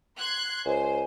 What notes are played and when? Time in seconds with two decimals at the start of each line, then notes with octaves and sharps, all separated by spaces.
0.17 C6 F#6 G#6
0.66 C#2 C5 G#5